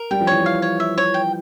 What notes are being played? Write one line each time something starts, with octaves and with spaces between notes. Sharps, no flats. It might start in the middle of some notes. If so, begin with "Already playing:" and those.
Already playing: A#4
G3 G5
F3
E3 C#5
F3
F5
C#5
E5
C#5
G5